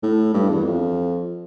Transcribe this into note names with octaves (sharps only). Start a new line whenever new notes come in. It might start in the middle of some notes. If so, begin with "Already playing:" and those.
A2
G2
E2
F2